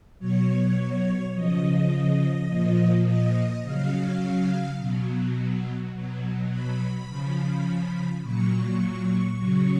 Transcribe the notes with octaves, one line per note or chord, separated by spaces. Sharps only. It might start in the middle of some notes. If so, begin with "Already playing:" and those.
B2 F#3 C#5
C#3 F3 D#5
A#2 F3
D#5
C#3 F#3 F5
B2 F#3
B2 F#3
B5
C#3 F3
A#2 F#3 C#6
C#3 F#3